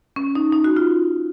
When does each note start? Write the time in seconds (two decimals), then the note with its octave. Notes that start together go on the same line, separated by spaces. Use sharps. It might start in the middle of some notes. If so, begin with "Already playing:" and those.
0.16 C#4
0.35 D#4
0.52 D#4
0.64 F#4
0.77 F4